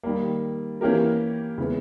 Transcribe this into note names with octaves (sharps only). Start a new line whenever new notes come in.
D#3 G3 A#3
E3 A#3 C#4 G4 A#4
C#3 E3 G#3 B3